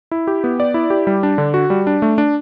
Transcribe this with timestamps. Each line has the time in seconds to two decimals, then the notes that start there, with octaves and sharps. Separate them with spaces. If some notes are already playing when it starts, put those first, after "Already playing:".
0.11 E4
0.27 G4
0.44 B3
0.60 D5
0.74 E4
0.90 G4
1.07 G3
1.23 D4
1.38 D3
1.54 F#4
1.70 G3
1.87 D4
2.02 A3
2.18 D4